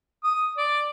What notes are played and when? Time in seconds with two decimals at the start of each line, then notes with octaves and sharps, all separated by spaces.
0.24 D#6
0.58 D5